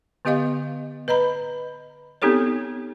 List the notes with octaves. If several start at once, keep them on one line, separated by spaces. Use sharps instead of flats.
D3 B3 G4 D#5 F5 D6
B4 D#5 A#5 B5
B3 C4 D#4 G4 A4 C#5